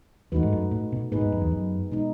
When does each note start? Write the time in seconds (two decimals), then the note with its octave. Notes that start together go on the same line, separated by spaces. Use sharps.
0.32 E2 A3 D#4 F#4 B4
0.43 G#2
0.52 F#2
0.71 A2
0.92 B2
1.12 A2 B3 D#4 G#4 B4
1.21 G#2
1.32 F#2
1.42 E2
1.52 F#2
1.92 B2 G#3 D#4